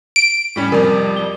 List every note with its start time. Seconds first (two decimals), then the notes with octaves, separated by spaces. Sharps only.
0.16 D7
0.56 A2 G3 C#4
0.72 F2 C3 G3 A#4
1.16 G7